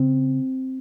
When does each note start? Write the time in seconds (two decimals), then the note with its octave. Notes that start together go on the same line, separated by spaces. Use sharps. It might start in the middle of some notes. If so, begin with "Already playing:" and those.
Already playing: C#3 C4